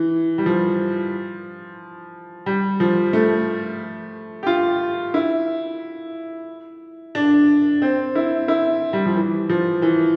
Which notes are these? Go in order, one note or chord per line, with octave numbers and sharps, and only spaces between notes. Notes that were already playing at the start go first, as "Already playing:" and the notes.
Already playing: E3
G3
F3
G3
F3
A3
G4
F4
E4
D4
C4
E4
E4
G3
F3
E3
F3
E3